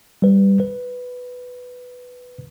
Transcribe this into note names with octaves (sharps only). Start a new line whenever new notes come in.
G3 B4
B4